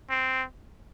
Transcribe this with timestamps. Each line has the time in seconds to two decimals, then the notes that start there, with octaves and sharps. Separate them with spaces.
0.10 C4